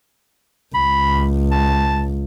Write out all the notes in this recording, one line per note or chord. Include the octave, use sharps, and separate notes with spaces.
C#2 B5
A5